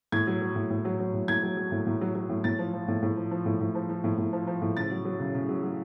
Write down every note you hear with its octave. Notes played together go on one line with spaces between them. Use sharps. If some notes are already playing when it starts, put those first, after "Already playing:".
A2 G#6
F#3
F#3
A2
A2
F#3
F#3
A2
A2 G#6
F#3
F#3
A2
A2
F#3
F#3
A2
A2 A6
F3
F3
A2
A2
F3
F3
A2
A2
F3
F3
A2
A2
F3
F3
A2
C#3 A6
F#3
F#3
C#3
C#3
F#3
F#3